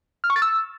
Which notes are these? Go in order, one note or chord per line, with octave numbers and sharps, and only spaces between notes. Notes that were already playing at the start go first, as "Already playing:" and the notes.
F6
C#6
A6
E6